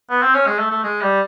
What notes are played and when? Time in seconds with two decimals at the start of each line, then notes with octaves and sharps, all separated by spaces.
0.10 B3
0.22 C4
0.34 C#4
0.46 G#3
0.58 A3
0.70 A3
0.83 G#3
1.01 G3